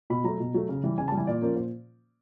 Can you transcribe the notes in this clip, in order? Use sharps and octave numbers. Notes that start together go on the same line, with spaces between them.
B2 B5
F#3 A3 A#5
B2
F#3 A3
C#3
E3 G3
C#3 G#5
A5
G3
E3 G#5
A#2 D5
F3 A#3 C#4
A#2 C5